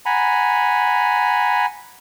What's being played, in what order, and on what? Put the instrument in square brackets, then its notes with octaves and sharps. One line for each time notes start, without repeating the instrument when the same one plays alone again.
[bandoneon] F#5 G#5 A#5 B5